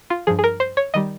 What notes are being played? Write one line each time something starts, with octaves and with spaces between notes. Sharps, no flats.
F4
G2 F3 G#4
G#4
A#4
C5
C#5
D#3 G3 D#5